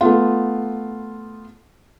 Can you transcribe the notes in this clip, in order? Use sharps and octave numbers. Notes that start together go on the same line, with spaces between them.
A3 B3 F4